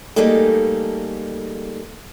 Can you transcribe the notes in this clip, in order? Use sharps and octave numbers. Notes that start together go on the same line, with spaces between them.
G3 A3 A#3 D#4 G#4 A4